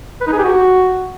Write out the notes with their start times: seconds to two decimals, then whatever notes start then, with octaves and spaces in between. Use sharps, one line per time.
0.21 B4
0.27 D#4
0.32 G#4
0.38 G4
0.44 F#4